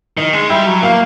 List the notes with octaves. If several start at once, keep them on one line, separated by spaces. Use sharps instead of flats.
D#3 D#5
G#3
G3 E5
F#3
A#3 F5